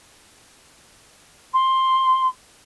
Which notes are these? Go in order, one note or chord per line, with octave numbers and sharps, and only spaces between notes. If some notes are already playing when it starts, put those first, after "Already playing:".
C6